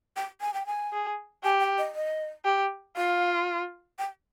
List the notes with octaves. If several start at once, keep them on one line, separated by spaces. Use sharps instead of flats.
G5
G#5
G5
G#5
G#4
G4 G#5
G5
D#5
D#5
G4
F4 F5
G5